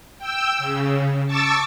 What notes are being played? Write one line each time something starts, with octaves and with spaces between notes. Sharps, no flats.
G5 E6
C#3
A5 C#6 D6 E6 A6